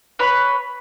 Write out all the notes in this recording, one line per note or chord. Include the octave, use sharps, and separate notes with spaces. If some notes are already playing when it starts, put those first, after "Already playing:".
B4 C#5 B5